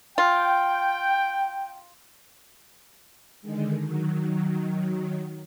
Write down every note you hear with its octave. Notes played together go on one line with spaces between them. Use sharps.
F4 G5
D3 D#3 G#3
D#3 F#3